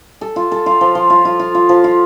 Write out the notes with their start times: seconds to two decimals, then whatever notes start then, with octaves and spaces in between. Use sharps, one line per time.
0.21 A4
0.36 F4
0.52 A4
0.66 F4
0.81 F3
0.95 F3
1.10 F4
1.25 F4
1.39 F4
1.55 F4
1.69 F3
1.84 F4